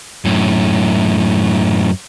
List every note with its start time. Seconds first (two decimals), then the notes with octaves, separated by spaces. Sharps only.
0.25 F#2 A2